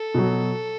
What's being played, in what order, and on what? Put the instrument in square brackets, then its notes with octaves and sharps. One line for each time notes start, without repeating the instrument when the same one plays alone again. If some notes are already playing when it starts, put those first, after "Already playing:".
Already playing: [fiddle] A4
[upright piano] B2 F#3